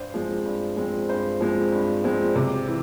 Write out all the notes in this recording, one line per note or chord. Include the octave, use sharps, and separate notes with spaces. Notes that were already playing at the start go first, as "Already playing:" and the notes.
Already playing: G2 C5
F3 G#3 C4
G2
F3 G#3 C4
G2 C5
F3 G#3 C4
G2
F3 G#3 C4
C3
E3